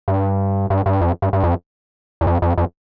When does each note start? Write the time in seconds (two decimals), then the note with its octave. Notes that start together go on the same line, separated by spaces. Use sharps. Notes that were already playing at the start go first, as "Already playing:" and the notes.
0.08 G2
0.70 G2
0.86 G2
1.01 F2
1.22 G2
1.33 G2
1.43 F2
2.21 E2
2.27 F2
2.42 F2
2.58 F2